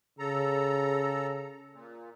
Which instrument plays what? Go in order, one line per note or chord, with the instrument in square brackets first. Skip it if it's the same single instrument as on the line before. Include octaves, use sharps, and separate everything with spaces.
[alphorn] C#3 [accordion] A4 A#5
[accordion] A#2